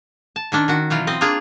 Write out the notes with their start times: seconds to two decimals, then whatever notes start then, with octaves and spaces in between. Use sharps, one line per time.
0.36 A5
0.52 D#3 C#4 D4
0.68 D#3 F#4
0.90 B2 E3 F#3 F4
1.07 C4 D#5
1.21 A#3 D4 F4 G#4